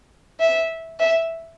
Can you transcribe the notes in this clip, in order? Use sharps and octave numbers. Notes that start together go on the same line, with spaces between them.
E5
E5